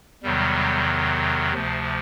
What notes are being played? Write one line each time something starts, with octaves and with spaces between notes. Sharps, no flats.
E2 C3 D#3 F#3 G3
D2 C3 F3